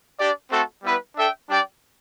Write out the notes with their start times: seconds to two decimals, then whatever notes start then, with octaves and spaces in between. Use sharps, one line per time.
0.19 D4 G4 D5
0.51 A3 C4 F#4 A4
0.84 G3 B3 E4 B4
1.16 D4 A4 E5 G5
1.48 G3 D4 G4 D5 G5